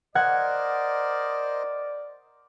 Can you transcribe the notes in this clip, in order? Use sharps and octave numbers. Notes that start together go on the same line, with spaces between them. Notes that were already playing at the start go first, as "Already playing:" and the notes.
A#4 C5 D5 D#5 F#5 G#6